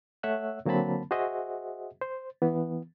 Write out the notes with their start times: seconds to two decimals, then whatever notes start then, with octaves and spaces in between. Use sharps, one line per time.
0.23 A3 C#5 E5 F#5 E6 F#6
0.66 D3 F#3 A#3 C4 A5 B5
1.11 F#4 G#4 C5 D#5 E5 F#5
2.01 C5
2.42 E3 B3